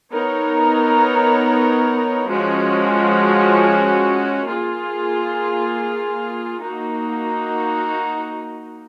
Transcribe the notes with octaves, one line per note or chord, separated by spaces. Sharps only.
B3 D#4 A#4 C#5
F3 G#3 C#4 F#4
A#3 F4 G#4
A#3 D#4 F#4